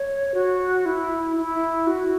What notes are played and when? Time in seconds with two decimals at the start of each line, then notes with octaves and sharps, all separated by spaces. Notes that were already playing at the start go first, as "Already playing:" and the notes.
Already playing: C#5
0.34 F#4
0.86 E4
1.36 E4
1.87 F#4